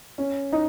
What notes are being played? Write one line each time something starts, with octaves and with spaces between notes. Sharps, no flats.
C#4
D#4